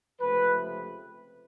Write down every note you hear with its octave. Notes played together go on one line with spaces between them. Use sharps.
C#2 C3 F3 A3 B4